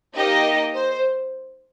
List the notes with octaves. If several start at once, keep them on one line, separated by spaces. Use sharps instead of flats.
A#3 D#4 G4 D#5
C5